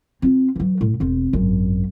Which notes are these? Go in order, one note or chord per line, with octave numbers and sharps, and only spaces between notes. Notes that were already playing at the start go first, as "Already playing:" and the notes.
C4 F4
E3 F#3
A2
E1 C4
G#1 F#2